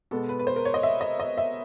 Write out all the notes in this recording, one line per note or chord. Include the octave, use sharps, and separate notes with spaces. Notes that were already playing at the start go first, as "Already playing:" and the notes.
B2 G#3 B3 A4
B4
B4
C5
A#4
C#5
D#5
E5
D#5
D#5
E5